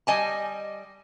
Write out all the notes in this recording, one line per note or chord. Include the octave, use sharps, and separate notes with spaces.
G3 D#5 G#5 A5